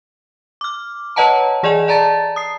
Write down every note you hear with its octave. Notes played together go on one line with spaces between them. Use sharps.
D6 F6
B4 C#5 D#5 F#5 A5 A#5
E3 G#4 D5 D#5 G#5 E7
D5 A5 A#5 A6
D#6 C7